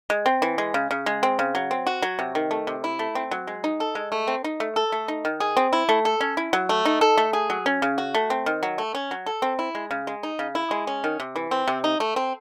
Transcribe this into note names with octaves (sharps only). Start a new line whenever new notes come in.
G#3
C4
E3
G#3
C#3
C#3
G#3
C4
C#3
F#3
C4
F#4
F#3
C3
D#3
A3
C3
E4
A3
C4
F#3
G#3
D#4
A4
G#3
A3
C4
D#4
A3
A4
A3
D#4
D#3
G#4
C4
E4
A3
A4
C#4
E4
F#3
A3
D#4
A4
A3
G#4
F#3
C#4
C#3
F#4
A3
C4
D#3
F#3
A3
C#4
F#3
A4
C4
E4
G#3
C#3
G#3
D#4
C#3
E4
G#3
C#4
D#3
C3
E3
C4
C3
D#4
A3
C4